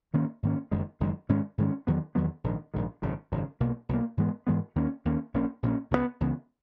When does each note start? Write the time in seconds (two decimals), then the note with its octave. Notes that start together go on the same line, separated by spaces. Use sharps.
0.13 G#2 D#3 A#3 C#4
0.43 G#2 D#3 A#3 C#4
0.71 F#1 F#2 D#3 G#3
1.00 F#1 F#2 D#3 G#3
1.29 G#2 D#3 G#3 C#4
1.58 G#2 D#3 G#3 C#4
1.87 E2 D#3 F#3 B3
2.15 E2 D#3 F#3 B3
2.44 A#1 G#2 D#3
2.74 A#1 G#2 D#3
3.02 G#1 F#2 C#3
3.32 G#1 F#2 C#3
3.60 B1 B2 A#3
3.89 B1 B2 A#3
4.17 G#2 E3 G#3 B3
4.47 G#2 E3 G#3 B3
4.76 D#2 D#3 A#3 C#4
5.05 D#2 D#3 A#3 C#4
5.34 A#1 A#2 A#3 C#4
5.63 A#1 A#2 A#3 C#4
5.91 C#2 C#3 E3 B3
6.21 C#2 C#3 E3 B3